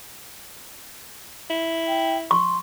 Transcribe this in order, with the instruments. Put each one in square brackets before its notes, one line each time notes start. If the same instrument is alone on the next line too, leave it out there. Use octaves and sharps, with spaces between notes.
[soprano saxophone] E4
[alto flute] G5
[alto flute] C6 [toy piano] C#6